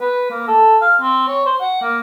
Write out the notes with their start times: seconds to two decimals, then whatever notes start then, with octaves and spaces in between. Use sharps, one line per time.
0.01 B4
0.30 A#3
0.48 A4
0.81 F5
1.01 C4
1.28 C#5
1.46 C5
1.61 F#5
1.82 A#3